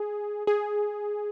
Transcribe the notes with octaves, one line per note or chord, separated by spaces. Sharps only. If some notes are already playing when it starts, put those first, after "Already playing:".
Already playing: G#4
G#4